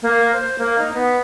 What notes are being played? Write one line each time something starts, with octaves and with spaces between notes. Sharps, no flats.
A#3
C5
A#3
D#4
B3